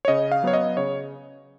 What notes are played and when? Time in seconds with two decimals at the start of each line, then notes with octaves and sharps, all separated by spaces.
0.05 C#5
0.08 C#3 D#5
0.32 F5
0.43 F#3 B3 C#5
0.54 D#5
0.77 C#3 C#5